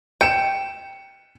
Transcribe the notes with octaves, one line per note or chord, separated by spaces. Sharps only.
G5 C#7 E7